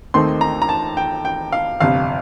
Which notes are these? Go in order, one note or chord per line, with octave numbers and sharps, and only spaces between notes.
D#2 D#3 A3 C4 D#4 C6
A#5
A#5
A5
G5
G5
F5
G1 F2 C3 F5